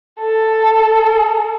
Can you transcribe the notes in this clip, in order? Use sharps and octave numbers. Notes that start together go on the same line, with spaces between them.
A4